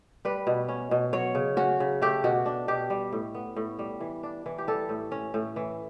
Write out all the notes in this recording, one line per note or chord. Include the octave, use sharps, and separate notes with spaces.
G3 B4
B2
C#4
B2
F#3 C#5
C#3
C#4 F#4
C#3
A3 G4
B2 F#4
D4
B2 G4
G3
A2
B3
A2
G3
E3
D4
E3
G4
G3 A4
A2
C#4
A2
E3